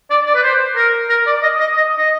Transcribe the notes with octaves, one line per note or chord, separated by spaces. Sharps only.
D5
D5
B4
C5
A#4
A#4
D5
D#5
D#5
D#5
D#5